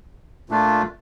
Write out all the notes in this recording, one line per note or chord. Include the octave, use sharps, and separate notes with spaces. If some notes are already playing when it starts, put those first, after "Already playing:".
A#2 A3 D4 F4